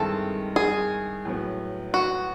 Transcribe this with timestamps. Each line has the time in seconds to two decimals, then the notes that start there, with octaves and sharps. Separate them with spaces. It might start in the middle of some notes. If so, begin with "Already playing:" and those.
Already playing: G2 D#3 G#3 C4 E4 A4
0.56 G#4
1.25 A2 F#3 B3
1.94 F#4